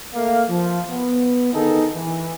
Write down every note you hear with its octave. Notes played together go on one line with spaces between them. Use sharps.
A3 A#3 F5
F3
B3
D3 D#3 B3 D#4 G#4 A4
E3